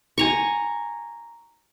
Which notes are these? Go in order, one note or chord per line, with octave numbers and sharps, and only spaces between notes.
G#5 A#5 C#6